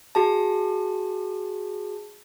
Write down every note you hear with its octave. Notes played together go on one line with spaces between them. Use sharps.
F#4 G#4 A5